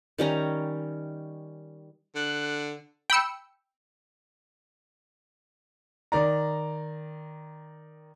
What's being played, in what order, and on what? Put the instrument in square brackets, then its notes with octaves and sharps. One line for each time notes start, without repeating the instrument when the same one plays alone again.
[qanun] D#3 G3 C#4 A#5
[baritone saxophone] D3 [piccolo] F#6
[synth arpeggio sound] G5 B5 E6 C#7
[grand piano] D#3 D5 A#5